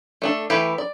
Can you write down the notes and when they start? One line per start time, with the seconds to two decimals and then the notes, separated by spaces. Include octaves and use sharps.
0.22 A3 D4 A4
0.50 E3 A3 E4 G4 B4
0.78 D5